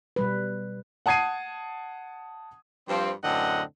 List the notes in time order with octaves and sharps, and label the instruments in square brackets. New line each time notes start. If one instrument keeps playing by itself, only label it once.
[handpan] B2 G3 B4
[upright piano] F#5 A5 D#6 G#6 C7 D#7
[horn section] G2 F3 C4
F#2 A2 D3 C4 D#5 F#5